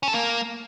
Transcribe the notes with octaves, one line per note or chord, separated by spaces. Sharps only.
C#4
A4
A#3